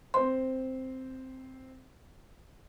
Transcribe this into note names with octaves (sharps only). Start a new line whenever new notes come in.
C4 C5 C6